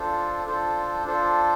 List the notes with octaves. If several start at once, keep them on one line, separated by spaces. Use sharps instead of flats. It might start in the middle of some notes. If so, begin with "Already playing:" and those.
Already playing: D4 F4 A4 C5
D4 F4 A4 C5
D4 F4 A4 C5